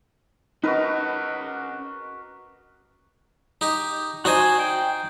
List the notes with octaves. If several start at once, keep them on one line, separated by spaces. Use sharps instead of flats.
C#4 D#4 F#4 A#4 B4 D#5
D#4 G4
D4 D#4 F#4 C5 G#5
G5